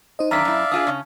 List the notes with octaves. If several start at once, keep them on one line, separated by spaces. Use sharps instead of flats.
D#4 C5 D#5
F#2 D#3 D4 D5 E5 F5 A#5 B6
F#2 E4
D4 F4 G#4 D#6
C#3 C#4